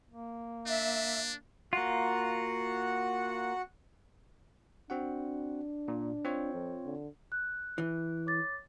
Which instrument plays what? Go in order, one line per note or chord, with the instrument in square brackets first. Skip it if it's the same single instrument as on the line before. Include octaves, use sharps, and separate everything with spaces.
[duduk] A#3
[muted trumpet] D4 [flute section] E5
[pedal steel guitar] A#3 F4 [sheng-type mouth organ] F#4 F#5
[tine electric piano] C4 F#4 F#5 [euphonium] D4
[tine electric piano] A#2
C4 F4 C#5
[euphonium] F2
D3
[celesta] F#6
[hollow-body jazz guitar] E3
[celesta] C#5 D6 A6